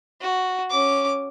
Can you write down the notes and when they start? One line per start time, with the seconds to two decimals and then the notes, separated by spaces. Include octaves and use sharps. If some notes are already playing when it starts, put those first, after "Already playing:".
0.21 F#4
0.71 C#4 D6